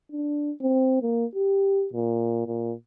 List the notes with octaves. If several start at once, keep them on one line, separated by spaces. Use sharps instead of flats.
D4
C4
A#3
G4
A#2
A#2